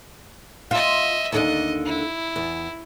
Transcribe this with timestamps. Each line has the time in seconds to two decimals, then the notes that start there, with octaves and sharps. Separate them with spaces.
0.71 F4 D#5 E5
1.32 D#2 D3 D4 D#5
1.85 E4
2.36 E2